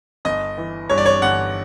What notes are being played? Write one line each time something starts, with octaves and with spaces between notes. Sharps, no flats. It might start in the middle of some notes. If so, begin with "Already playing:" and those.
G1 D#5
E3
G2 C#5
D5
C#5
G1 F#5